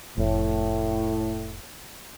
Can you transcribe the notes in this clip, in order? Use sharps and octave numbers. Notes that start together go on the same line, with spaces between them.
F1 A2